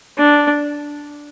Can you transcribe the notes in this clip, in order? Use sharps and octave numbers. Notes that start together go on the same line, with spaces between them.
D4